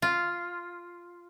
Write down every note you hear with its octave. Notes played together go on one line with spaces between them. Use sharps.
F4